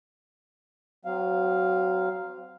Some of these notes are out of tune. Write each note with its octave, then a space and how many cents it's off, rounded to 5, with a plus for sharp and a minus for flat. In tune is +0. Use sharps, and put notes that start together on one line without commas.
F#3 +15 C4 -25 F5 +0